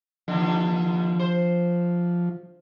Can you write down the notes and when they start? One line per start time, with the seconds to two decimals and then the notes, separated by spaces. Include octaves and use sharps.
0.28 D#2 D3 F3
1.19 C5